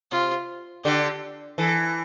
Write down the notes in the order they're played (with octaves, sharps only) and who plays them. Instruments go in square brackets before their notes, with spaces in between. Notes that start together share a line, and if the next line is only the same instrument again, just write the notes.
[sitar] C3 [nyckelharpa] F4
[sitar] D3 [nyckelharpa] G4
[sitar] E3 [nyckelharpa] A4